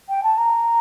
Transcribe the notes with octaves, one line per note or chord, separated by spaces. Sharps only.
G5
A5
A#5